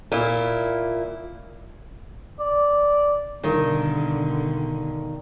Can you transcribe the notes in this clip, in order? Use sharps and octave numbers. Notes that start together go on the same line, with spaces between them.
A#2 E4
D5
G2 B2 D3 D#3